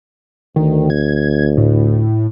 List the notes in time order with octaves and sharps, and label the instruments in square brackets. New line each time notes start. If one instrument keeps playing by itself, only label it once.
[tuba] D2 [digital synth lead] D#3
[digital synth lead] G#6
A2